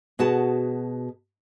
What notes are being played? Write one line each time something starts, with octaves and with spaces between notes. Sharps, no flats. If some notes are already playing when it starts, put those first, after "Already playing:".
B2 F#4 G#4 A5